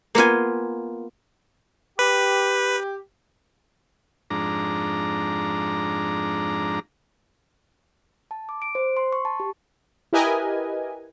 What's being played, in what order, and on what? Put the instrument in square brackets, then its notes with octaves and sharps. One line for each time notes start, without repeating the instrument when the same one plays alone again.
[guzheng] A#3 B3 F4 G#5
[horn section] G4 [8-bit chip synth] B4
[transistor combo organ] F2 G#2 D4 A#5
[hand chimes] A5
D6
D7
C5
C6
C#6
A5
G4
[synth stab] E4 G4 A#4 B4 D#5 G#5